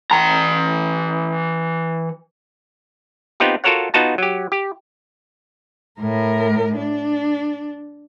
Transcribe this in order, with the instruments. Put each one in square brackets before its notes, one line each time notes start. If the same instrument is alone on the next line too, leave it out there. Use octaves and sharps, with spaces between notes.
[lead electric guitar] E3 A#5
[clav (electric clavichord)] B3 C4 D#4 F4 G4
F4 F#4 A4 A#4 C#5 F#5
B3 D#4 F4 F#4 A5
F#3 G4
G4
[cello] A2 A#4
D4